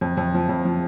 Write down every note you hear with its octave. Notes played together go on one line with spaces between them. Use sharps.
F2
F2
F3
F2
F3